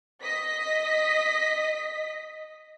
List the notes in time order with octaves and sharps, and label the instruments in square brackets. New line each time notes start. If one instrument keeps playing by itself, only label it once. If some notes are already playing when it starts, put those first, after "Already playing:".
[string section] D#5 B6